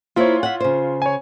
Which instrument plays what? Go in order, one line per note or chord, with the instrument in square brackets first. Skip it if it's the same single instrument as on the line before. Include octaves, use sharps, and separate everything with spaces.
[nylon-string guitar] A#3 E4 C5 [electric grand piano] F4 C#5
[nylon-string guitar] E5 F#5
C#3 C5
[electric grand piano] C#5 G#5